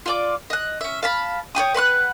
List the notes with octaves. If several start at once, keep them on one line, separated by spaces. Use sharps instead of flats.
F4 D5 D6
D#5 F#6
C#4 E5
F5 A5 B5
C#5 D5 G5 D#6
B4 F#5 C6 F#6